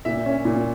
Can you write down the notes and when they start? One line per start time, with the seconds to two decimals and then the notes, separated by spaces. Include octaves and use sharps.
0.05 A#2 E5
0.26 C#4
0.45 A#2